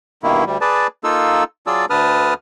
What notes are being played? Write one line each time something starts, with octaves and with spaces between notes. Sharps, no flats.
G2 B2 D#3 A#3 E4
D2 G3
G#4 B4 D5 A5
A#3 D#4 F4 A4 E6
F#3 F4 G#4 D5 A5 E6
D2 D3 B4 A5 D#6 F6